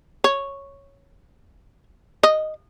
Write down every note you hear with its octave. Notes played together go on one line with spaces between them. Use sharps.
C#5
D#5